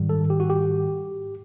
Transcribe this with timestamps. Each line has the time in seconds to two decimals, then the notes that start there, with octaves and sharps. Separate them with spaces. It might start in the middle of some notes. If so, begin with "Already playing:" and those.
Already playing: G#2 D#3 G3
0.09 A4
0.30 G4
0.40 F#4
0.50 G4